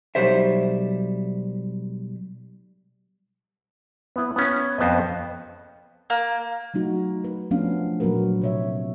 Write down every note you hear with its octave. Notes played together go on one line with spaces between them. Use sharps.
B1 E2 F#3 G3 C5 E5
B3 E4
B3 C#4
F2 B3 C5 D#5
A#3
F#3 A3 D#4 F#4
B4
F3 A3 B3 C#4 D4 F5
A#2 F#3 A#3 F#4 A#4 B4
C3 C#5 E5